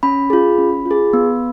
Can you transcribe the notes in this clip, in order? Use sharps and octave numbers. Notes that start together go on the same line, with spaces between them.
C#4 B5
F4 G#4
C#4
F4 G#4
B3